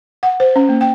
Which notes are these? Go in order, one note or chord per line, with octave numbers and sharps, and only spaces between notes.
F#5
C5
C#4
A#3
G5